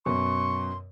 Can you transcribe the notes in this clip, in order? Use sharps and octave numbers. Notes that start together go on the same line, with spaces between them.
F#2 B2 C6 C#6